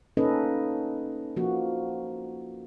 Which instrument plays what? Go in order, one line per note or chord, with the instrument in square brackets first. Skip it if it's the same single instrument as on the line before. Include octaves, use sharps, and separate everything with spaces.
[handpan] A#3 C#4 D#4 A4 B4 D#5
F3 A#3 F#4